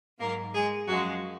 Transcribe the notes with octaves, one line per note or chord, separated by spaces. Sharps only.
G#2 F#3 A#3 A#4
G#3 G#4
F#2 F3 F#3 G#3 F#4